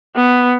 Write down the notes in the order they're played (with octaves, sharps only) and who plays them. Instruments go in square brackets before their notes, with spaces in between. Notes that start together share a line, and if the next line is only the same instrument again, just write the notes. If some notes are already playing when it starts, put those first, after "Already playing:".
[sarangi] B3